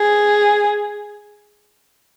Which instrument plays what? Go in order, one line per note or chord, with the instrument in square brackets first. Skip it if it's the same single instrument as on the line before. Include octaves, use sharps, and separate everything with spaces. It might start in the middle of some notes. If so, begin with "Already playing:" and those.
Already playing: [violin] G#4